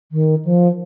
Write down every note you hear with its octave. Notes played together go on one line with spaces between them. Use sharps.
D#3
F3